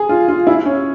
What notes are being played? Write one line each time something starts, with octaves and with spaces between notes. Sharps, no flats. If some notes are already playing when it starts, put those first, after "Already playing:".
Already playing: G#4
F4
F4
E4
C#4